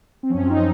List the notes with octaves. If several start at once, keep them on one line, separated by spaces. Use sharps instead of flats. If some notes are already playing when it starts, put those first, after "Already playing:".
C4
F#2 F3 C#4
C4
D#4